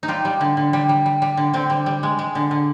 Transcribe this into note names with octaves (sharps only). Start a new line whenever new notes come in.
D#4
G3 F4
G3
D3
D3
G3
G3
G3
G3
D3
D3 C4
G3
G3
G#3
G#3
D3
D3